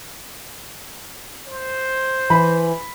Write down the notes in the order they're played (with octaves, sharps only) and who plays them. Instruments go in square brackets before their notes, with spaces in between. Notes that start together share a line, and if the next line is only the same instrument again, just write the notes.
[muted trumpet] C5
[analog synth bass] E3 [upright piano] B5